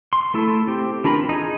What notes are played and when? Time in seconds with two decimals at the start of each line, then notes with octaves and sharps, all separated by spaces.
0.13 C6
0.34 A3 E4 A4
0.67 C4 G4
1.04 E3 D4 F4 A#4 B5
1.29 D#4 G#4